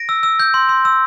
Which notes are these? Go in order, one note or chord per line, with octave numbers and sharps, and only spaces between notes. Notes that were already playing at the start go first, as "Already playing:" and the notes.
Already playing: A#6 D7
E6
E6
G6
C6
C6
E6